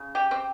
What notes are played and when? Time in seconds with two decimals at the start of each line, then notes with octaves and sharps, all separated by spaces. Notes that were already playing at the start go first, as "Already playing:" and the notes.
Already playing: C#3
0.15 G4
0.31 C4